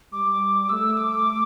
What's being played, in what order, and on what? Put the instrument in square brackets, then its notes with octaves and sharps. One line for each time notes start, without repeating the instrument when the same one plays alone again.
[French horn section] G3 [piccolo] D6
[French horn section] A3 [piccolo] E6
[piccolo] D6